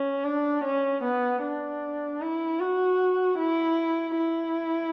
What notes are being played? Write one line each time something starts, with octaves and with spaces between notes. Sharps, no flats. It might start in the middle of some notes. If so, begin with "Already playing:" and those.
Already playing: C#4
D4
C#4
B3
D4
E4
F#4
E4
E4